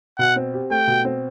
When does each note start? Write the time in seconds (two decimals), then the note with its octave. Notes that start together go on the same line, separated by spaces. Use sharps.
0.19 B2 F#5
0.36 C4
0.54 G4
0.70 A3 G5
0.88 B2
1.05 C4